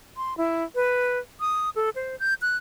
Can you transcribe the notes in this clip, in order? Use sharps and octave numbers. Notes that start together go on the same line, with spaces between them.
C6
E4
B4
D#6
A4
C5
G6
F#6